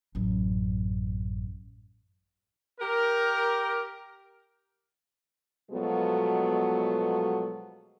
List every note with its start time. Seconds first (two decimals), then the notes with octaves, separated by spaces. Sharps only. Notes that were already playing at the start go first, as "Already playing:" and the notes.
0.15 A1 F#2
2.80 G4 A#4
5.70 B2 F3 F#3 G#3 A3 B3